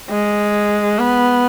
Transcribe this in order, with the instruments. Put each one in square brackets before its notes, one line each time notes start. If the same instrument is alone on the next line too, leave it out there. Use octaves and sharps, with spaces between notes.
[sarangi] G#3
B3